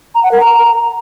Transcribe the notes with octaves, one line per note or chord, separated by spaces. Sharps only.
A#5
F#5
A#4
A#5